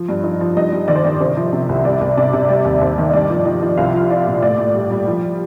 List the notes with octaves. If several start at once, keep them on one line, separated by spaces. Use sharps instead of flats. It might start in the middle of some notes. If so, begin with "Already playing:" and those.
Already playing: F3
G2
F3 D#4 D#5
F3
G2 D#4 D#5
G3
D#3 D5
C5
D#3 D5
C3 C5
F3
C3
C2
G3 D5
C2
C3 D5
C3
G3 D5
D#2
D#2 C5
D#3
D#5
G2 D5
F3
F3 D#4 D#5
F3
C2 F4 F5
F3
F3 D5
A#2
A2 D5
A2
G3
G3
F3